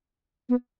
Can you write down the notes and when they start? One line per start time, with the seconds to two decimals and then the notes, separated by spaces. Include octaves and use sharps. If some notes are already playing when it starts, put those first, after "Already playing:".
0.49 B3